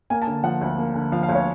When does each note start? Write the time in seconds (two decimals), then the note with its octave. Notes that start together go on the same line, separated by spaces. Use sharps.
0.10 A#3 G#5
0.22 A5
0.27 D3
0.43 F3 F#5
0.61 D2
0.78 A#3
0.95 D3
1.12 F3 F5
1.23 F5
1.29 D2
1.35 C#5